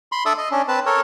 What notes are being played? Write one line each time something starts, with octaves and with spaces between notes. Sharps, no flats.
B5 C6
D4 A4 D5 E5 D#6 E6
D#5
C#4 D4
C4 B4 A5
A4 A#4 C#5